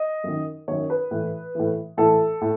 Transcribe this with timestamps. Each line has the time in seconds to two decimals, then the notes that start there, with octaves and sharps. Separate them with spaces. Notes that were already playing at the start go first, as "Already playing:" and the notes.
Already playing: D#5
0.24 F#2 D#3
0.68 F#2 D#3 C#5
0.90 B4
1.11 A2 E3
1.55 A2 E3
1.97 A2 E3 A4
2.41 A2